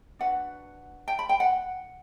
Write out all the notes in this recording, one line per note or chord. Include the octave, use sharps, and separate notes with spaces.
D4 F#4 B4 F#5
G5
B5
G5
F#5